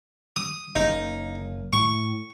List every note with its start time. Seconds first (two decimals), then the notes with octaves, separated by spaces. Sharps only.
0.36 D#6
0.75 F#1 A#3 D#4
1.73 A2 C#6